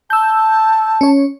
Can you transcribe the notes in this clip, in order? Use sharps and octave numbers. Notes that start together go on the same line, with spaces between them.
A5 E6 G6
C#4 C#5